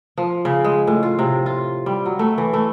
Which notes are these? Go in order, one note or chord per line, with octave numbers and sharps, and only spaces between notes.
F3
C#3
G#3
A2
F4
C3
F4
G3
F#3
A3
E3
A3